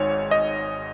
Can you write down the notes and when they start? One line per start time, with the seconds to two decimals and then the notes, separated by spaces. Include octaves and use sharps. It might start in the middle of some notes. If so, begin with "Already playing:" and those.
Already playing: G#1 G#2 C#5
0.31 D#5